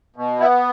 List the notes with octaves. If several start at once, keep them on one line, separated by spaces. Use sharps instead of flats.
B2
B3 E4